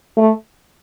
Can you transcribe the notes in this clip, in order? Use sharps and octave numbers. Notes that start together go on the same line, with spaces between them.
A3